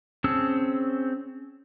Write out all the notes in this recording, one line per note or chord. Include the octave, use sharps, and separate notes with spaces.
C4 C#4 G#4 A5 E6